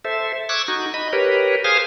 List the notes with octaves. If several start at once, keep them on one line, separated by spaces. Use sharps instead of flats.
A4 C5 E5
C#6 D6 E6 F#6 G#6
D#4 F#4
D#5 B5
G4 A#4 B4 C#5
G#4 C5 F5 G#5 D#6 F6